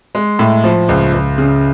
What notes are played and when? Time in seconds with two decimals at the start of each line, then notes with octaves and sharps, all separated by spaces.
0.15 G#3
0.39 A2
0.64 F3
0.89 C#2
1.13 C#2
1.38 C#3